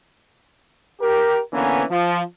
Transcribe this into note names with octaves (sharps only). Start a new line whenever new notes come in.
G4 A#4
D3 E3 A#3 B3 C#4
F3